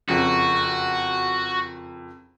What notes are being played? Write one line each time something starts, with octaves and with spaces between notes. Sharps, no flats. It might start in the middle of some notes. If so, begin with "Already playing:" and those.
F#1 F2 F#4